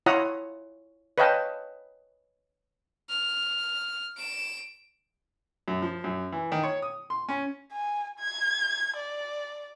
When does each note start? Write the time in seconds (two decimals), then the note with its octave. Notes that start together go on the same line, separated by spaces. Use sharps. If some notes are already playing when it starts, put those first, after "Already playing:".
0.06 E4 F4 C#5 F#5 A#5 D#6
1.18 B4 C#5 D#5 F5 G5 A5
3.09 F6
4.17 D7 E7
5.68 F#2
5.82 F3
6.04 F#2
6.32 E3
6.52 D#3
6.63 C#5
6.82 D#6
7.10 C6
7.29 C#4
7.73 G#5
8.20 G#6
8.97 D5